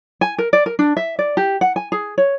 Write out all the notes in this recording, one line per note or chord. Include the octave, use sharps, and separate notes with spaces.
G#5
A#4
D5
A#4
D4
E5
D5
G4
F#5
G#5
G#4
C#5